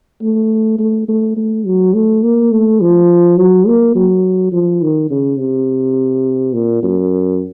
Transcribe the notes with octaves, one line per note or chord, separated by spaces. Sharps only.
A3
A3
A3
A3
F#3
A3
A#3
A3
F3
F#3
A#3
F#3
F3
D#3
C#3
C3
A#2
F#2